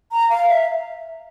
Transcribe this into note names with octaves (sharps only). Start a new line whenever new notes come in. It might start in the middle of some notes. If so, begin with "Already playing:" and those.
A#5
F5
E5